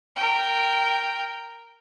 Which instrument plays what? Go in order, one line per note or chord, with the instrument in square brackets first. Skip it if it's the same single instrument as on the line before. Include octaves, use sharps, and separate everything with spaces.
[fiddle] A#4 G5